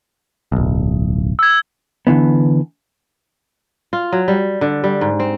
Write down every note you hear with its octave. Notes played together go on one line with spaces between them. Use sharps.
D1 B1
E6 G#6
D3 E3 B3
F4
F#3
G3
D3
G3
G#2
C4